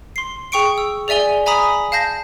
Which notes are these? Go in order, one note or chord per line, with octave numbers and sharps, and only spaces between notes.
C6 C7
G#4 G5 C#6 C#7 D7
E6
G#4 D5 E5 G#5 G7
E5 G#5 A#5 B5 D#6 B6
F5 A5 G6 A#6